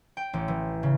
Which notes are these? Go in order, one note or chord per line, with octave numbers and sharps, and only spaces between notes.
G5
A1
E3
C#3